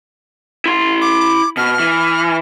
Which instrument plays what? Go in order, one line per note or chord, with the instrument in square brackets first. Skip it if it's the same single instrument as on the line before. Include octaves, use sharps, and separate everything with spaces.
[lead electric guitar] E4 C6
[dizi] D6
[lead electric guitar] B2 [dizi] F6
[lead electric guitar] E3